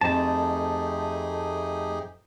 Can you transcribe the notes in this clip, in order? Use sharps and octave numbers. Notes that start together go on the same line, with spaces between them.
F2 A3 D#4 G4 G#4 A5